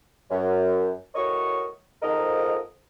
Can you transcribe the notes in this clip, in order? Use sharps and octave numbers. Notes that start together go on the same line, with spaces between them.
F#2
A2 F#4 A#4 C#5 D#5 C#6
F2 G#2 A#4 D#5